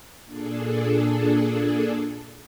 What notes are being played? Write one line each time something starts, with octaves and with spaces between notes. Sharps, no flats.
A#2 D4 G#4 A4